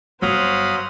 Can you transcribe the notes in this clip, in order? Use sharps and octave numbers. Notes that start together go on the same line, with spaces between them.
G1 F#3 C5 F5 B5 C6 D#6